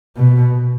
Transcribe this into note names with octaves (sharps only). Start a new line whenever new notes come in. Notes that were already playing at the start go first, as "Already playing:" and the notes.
B2